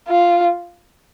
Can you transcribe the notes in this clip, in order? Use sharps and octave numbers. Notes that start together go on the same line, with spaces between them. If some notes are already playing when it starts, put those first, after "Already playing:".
F4